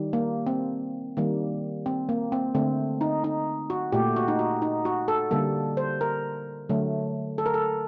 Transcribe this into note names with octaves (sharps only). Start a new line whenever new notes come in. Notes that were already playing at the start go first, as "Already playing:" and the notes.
Already playing: D#3 G3
A#3
C4
D#3 G3 A#3
C4
A#3
C4
D3 A3 C4
D#4
D#4
F#4
A#2 A3 G4
F#4
D#4
F#4
D#4
F#4
A4
D3 G3 A#3 A4
C5
A#4
D3 F#3 A3
A4
A#4
A4